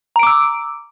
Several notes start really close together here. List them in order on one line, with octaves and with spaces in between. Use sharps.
A#5 D7 D6 E6